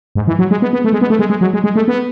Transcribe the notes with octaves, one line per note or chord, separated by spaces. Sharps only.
G#2
E3
F#3
G#3
B3
B3
A3
G#3
B3
A3
G#3
G#3
F#3
G#3
G#3
A3
B3